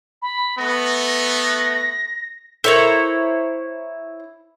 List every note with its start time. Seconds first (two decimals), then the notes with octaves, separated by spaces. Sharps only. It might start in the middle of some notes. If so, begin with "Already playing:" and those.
0.22 B5
0.58 A3 B3 A#6
1.08 A#6
2.64 E4 A4 A#4 C5 C#5 A#5